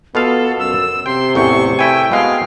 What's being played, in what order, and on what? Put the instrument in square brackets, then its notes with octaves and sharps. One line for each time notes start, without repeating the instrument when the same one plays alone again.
[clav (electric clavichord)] B2 F4 F5 [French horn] B3 [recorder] A4
[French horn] F#2 [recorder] E6
[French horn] C3 [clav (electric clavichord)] G5 [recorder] C6
[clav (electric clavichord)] A1 E2 G5 [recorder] C#6
[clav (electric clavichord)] A3 E4 G#5 [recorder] G5
[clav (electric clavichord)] B2 G#3 [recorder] F5